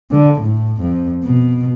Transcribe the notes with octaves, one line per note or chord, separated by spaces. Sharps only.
D3
A2
F2
B2